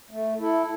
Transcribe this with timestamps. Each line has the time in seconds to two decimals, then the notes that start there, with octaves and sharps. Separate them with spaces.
0.11 A3
0.40 E4 A4